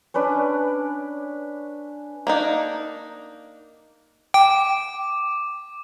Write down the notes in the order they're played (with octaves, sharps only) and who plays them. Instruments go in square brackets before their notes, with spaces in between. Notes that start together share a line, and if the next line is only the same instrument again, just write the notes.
[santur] C#4 D4 B4 D5
[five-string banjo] A#3 D4 D#4
[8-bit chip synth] G5 [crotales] D6